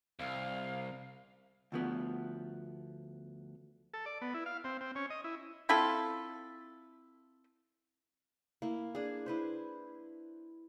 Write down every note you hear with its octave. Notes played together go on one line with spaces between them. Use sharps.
C2 F5
D2 F3 B3
A4
D5
B3
E4
F5
C4
C4
C#4
D#5
E4
C4 E4 F4 A4
A#3 E4
D4 G#4
E4 B4 C5